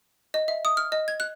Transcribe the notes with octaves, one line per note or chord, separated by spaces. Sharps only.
D#5
E5
D#6
F6
D#5
G#6
F#6